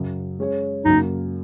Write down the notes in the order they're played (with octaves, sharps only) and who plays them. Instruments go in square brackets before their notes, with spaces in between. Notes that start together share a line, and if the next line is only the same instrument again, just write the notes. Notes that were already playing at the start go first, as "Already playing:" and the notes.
Already playing: [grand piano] F#2 C#3 F#3
G#3 C#4 G#4 C#5
[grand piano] F#2 C#3 F#3 A#3 [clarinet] D#4